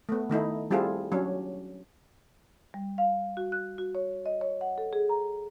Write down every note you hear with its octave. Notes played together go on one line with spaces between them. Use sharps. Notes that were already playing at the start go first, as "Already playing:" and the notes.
A3 B3
D#3 A3 D#4 E4
G3 C4 E4 F4 G#4 A4
F#3 C#4 D4
G3
F5
F#4
F#6
F#4
C#5
D#5
C#5
F#5
A4
G#4
A#5